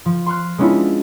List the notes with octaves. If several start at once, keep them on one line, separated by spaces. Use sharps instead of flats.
F3
C6 C#6 F6 F#6
G#3 B3 C#4 D4 E4 F4